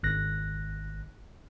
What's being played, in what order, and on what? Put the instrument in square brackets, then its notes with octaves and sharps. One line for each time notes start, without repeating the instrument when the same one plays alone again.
[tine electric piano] G#1 F#6 A#6